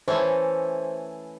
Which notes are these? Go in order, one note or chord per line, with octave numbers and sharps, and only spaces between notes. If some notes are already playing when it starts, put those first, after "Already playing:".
E3 A3 C#4 C5